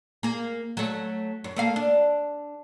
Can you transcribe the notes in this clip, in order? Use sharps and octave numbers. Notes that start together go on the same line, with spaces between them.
A#3 G#4
F#3 A3
F#2
A3 A#3 F5
D4